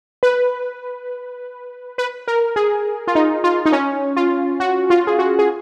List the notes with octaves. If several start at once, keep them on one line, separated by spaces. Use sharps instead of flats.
B4
B4
A#4
G#4
F4
D#4
F4
D#4
C#4
F4
F#4
F4
G#4
F#4
G#4